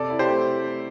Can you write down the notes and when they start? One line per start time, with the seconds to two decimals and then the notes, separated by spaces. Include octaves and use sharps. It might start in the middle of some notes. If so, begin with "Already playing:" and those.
Already playing: C3 A4 D5
0.10 E4
0.19 G4 C5
0.29 A3